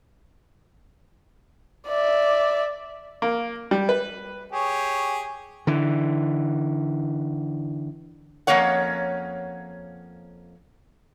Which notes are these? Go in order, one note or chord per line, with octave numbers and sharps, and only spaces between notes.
D5 E5
A#3
G3
B4
G4 G#4 C#5
D3 E3
F2 D#3 A#3 C#4 C#5 F#5